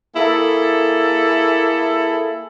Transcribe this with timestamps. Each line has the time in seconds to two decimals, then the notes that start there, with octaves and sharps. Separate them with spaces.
0.16 A#3 E4 G#4 A4